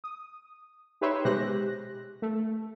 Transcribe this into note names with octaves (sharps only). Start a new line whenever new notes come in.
D#6
D#4 G4 B4 C#5 E5 C6
B2 G#3 G4 C5 F#6 A#6
A3